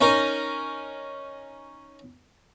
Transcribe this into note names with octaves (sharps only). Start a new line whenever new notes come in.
C#4 D#4 A#4